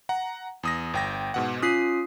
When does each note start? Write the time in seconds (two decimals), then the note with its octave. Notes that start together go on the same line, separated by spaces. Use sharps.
0.09 F#5 A#5
0.63 E2 D#6 A#6
0.94 G1 G5 A#6
1.34 G#2 B2 F#5
1.62 C#4 F4 D#6 C7